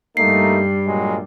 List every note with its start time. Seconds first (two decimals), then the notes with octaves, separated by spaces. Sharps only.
0.17 G2 G3 A3 A#3 D#4 C7
0.87 A#2 F#3 G#3